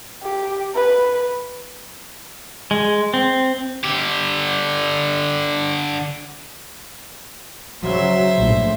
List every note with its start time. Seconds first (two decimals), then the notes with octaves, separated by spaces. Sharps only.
0.23 G4
0.75 B4
2.71 G#3
3.14 C4
3.84 D3 G4
7.83 C#3 F#3 C5 E5
8.38 A#1 A2